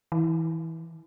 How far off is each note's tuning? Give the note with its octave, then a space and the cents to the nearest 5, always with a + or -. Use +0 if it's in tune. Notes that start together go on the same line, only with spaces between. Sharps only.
E3 -20